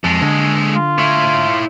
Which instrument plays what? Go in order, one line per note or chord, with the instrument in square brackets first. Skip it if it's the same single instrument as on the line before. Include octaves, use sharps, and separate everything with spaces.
[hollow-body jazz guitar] F2 [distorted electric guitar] G#3 A4
[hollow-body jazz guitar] D3
[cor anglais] F4
[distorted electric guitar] E4 C#5